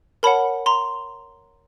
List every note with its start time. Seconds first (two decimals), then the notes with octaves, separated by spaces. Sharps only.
0.23 A#4 C#5 F#5 A5 B5
0.66 A#5 C6